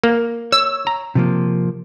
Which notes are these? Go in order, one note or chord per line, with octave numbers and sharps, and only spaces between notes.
A#3
C#5 E6
A#5
C3 F3 A#3